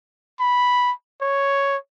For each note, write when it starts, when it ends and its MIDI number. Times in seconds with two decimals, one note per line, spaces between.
0.40 0.92 83
1.22 1.77 73